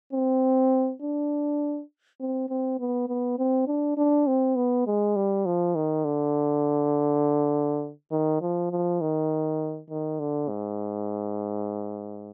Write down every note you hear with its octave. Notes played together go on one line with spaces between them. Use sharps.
C4
D4
C4
C4
B3
B3
C4
D4
D4
C4
B3
G#3
G3
F3
D#3
D3
D#3
F3
F3
D#3
D#3
D3
G#2